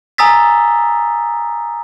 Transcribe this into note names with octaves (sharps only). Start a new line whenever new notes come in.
G#5 A#5 D#6 E6 A6 B6